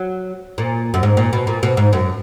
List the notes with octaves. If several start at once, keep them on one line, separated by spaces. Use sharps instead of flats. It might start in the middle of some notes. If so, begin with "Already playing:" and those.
Already playing: F#3
A#2
F#2
G#2
A#2
B2
A#2
B2
G#2
F#2